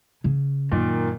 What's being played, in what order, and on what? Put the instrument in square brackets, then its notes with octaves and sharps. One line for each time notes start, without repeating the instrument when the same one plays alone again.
[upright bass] C#3
[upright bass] F#2 [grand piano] A#2 D#3